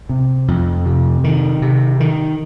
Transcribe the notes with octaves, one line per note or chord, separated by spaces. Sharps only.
C3
F2
C3
D#3
C3
D#3